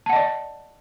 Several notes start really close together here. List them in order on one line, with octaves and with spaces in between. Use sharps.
A5 F#5 D#5 D5